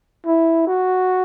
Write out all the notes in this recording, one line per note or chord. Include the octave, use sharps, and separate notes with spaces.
E4
F#4